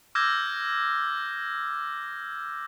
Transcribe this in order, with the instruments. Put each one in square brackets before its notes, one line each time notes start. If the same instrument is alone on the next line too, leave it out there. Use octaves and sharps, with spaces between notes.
[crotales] D6 E6 F6 G6 G#6 A#6